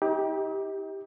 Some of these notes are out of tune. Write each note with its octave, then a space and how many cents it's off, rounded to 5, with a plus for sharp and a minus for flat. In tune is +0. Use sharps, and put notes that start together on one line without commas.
D#4 +40 G4 +5